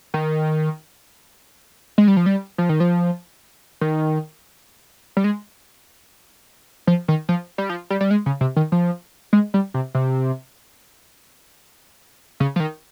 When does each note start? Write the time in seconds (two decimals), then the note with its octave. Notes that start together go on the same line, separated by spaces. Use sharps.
0.14 D#3
1.98 G#3
2.08 G3
2.17 F3
2.26 G3
2.58 F3
2.69 D#3
2.80 F3
3.81 D#3
5.17 G3
5.24 G#3
6.87 F3
7.08 D#3
7.29 F3
7.58 G3
7.69 F3
7.90 G3
8.01 G3
8.11 G#3
8.26 C#3
8.41 C3
8.56 D#3
8.72 F3
9.33 G#3
9.54 G3
9.74 C3
9.95 C3
12.40 C#3
12.56 F3
12.60 D#3